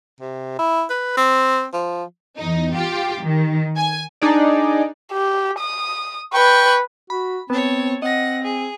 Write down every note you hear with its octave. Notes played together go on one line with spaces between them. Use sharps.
C3
E4
B4
C4
F3
E2 D#4
F4 G4
D#3
G#5
D4 D#4 G#4 D5
G4
D#6
B4 G5 C#6
F#4 B5
B3 C4 C#5 A5
C4 D#5 F#5 A#6
G#4